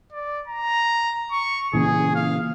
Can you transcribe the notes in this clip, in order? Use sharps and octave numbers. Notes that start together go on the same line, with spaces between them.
D5
A#5
C#6
A#2 C#3 E3 G#4
F5